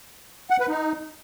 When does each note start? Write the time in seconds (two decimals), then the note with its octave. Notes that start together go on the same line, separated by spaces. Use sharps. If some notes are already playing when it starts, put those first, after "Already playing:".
0.50 F#5
0.60 B4
0.69 D#4